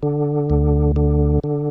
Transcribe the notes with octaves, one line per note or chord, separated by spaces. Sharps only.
D3
D2
D3
D3